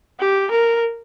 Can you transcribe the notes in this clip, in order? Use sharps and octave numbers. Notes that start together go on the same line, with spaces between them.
G4
A#4